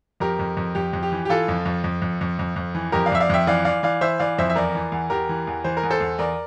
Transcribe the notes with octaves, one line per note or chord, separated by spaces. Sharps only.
F2 G4 A#4
F2
F2
F2 G4
F2
G4
E3
G4
E3 F4 A4
F2
F2
F2
F2
F2
F2
F2
E3
F2 G4 A#4
D5 F5
F2 E5
D5 F5
F2 E5 G5
E3 D5 F5
E3 D5 F5
E3 D5 F5
E3 C5 E5
E3 D5 F5
F2 C5 E5
E5
E2 A#4 D5
E3
E2
E2 G4 A#4
E3
E2
E3 C5
A#4
E2
A4 C5
E2
E2 A#4 D5